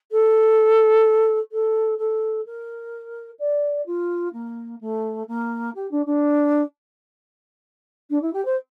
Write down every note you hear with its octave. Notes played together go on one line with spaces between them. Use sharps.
A4
A4
A4
A#4
D5
F4
A#3
A3
A#3
G4
D4
D4
D4
E4
G4
C5